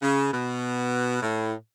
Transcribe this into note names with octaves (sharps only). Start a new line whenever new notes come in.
C#3
B2
A2